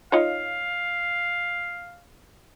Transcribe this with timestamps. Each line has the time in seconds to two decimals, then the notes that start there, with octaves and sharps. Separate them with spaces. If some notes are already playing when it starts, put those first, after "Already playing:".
0.12 D#4 F4 C#5 F5